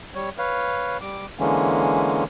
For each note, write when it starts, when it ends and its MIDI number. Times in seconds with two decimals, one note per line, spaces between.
0.15 0.30 55
0.15 0.30 73
0.38 0.98 71
0.38 0.98 73
0.38 0.98 77
1.01 1.26 55
1.01 1.26 86
1.40 2.24 50
1.40 2.24 52
1.40 2.24 56
1.40 2.24 58
1.40 2.24 61